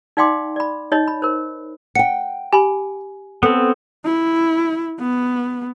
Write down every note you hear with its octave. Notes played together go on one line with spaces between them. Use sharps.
D#4 D5 F5 G5 C6 D6
D5 B5
D#4 C#5 D#5
B5
A#4 C5
F#5 G5 C#7
G4 G#5 B5
B3 C4 A4
E4
B3